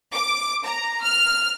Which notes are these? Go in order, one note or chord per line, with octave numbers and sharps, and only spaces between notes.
D6
A#5
F6